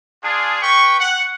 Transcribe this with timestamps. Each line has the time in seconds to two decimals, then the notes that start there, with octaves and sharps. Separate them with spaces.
0.24 D4 F4 G#4
0.62 B4 G5 C#6
1.00 F#5